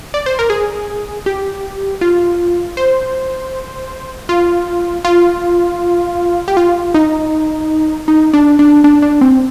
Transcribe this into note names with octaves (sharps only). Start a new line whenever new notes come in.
D5
C5
A#4
G#4
G4
F4
C5
F4
F4
G4
F4
D#4
D#4
D4
D4
D4
D4
C4